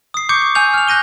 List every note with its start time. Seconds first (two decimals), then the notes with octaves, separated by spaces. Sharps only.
0.14 D#6 C7
0.29 C#6 D6 G6 C#7
0.42 D6
0.55 G#5 E6 G6 F7
0.74 F6 F7
0.87 F#6 G6 A#6 D#7 G7